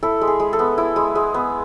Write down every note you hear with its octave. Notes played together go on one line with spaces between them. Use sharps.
E4 A4
G#3
G#4
G#3
A4
B3
E4
G#3
G#3
B3